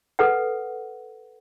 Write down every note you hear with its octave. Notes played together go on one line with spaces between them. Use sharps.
A4 B4 F#5